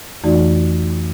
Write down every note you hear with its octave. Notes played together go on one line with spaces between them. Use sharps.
F2 E3 A3 D#4 F#4 D5